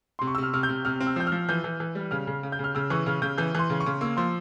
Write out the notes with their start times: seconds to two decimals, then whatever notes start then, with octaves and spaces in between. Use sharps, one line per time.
0.19 C3 C6
0.27 C#6
0.35 E6
0.38 C3 F6
0.53 C3 F6
0.63 G6
0.69 C3
0.85 C3 F6
1.00 C4
1.07 E6
1.16 F3 G6
1.27 F3 F6
1.49 E3 G6
1.64 E3
1.80 E3
1.95 G3
2.11 C#3 F6
2.27 C#3
2.43 C#3
2.52 G6
2.59 C#3
2.64 F6
2.75 C#3 E6
2.90 E3 C#6
3.06 C#3 F6
3.22 C#3 G6
3.38 E3 G6
3.55 E3 C6
3.70 C#3
3.80 C#6
3.86 C#3
4.01 A#3 E6
4.17 F3 C6